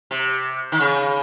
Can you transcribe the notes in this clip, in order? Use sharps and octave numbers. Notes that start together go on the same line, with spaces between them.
C3
D#3
C#3